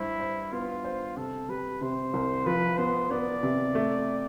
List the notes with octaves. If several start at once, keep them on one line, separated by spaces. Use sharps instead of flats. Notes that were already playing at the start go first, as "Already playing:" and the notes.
Already playing: G2 E4 C5
C5
B3 F4
C5
C3 A4
G3 B4
C3 C5
C2
F3 B4
B3 C5
B3 D5
C3
A3